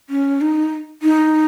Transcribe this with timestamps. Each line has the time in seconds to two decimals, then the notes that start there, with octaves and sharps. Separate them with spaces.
0.10 C#4
0.41 D#4
1.02 D#4